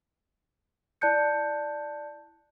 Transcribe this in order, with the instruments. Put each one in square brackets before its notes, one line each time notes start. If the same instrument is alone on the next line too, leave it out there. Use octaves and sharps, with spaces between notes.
[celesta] E4 D5 A5 F#6 G6 C#7